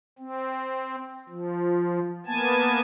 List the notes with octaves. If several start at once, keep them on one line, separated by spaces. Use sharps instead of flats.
C4
F3
A#3 B3 G#5 A5